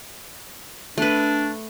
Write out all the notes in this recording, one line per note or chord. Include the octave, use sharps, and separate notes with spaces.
A3 D4 B4